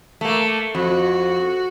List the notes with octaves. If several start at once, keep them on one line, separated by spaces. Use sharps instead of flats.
A3 A#3
F2 F#4